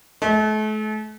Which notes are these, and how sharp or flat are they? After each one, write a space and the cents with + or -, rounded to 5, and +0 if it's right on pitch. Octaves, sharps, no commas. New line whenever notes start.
A3 -40